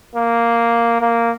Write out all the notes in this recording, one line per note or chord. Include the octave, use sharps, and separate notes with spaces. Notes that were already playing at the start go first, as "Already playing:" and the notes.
A#3
A#3